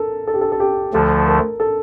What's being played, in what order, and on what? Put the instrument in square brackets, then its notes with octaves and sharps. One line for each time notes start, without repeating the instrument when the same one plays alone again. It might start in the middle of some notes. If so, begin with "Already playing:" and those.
Already playing: [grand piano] A4 A#4
A4
G4
A4
A4
G4
[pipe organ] D2 D3 F3 A3 [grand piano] A4
[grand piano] A#4
A4